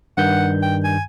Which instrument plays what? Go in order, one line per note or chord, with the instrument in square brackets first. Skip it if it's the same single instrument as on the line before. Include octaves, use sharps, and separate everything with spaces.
[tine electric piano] G2 D#3 G6 [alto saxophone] F#5
[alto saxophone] G5
G#5